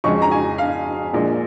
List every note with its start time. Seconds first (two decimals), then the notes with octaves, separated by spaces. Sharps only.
0.04 F2 C#3 G#3 C#6
0.22 A#5
0.31 G#5
0.58 F5
1.13 A#1 A#2 G#3